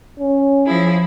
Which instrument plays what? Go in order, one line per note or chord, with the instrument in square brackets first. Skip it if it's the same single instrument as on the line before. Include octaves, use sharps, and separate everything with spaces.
[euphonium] C#4
[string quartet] F3 E4 G#4